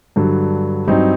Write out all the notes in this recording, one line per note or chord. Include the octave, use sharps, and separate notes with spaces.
G2 D3 F#3
G2 F#3 C4 D#4